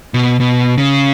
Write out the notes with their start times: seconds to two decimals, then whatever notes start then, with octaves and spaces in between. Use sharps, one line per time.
0.14 B2
0.40 B2
0.78 C#3